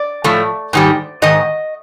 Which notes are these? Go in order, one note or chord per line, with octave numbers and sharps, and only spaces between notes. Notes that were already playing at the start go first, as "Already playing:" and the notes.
Already playing: D5
A2 F3 A3
G#2 D#3 G3
G#2 D#3 D#5